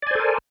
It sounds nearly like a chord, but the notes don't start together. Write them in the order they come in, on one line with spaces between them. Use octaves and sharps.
D5 G#5 C5 A4 A#4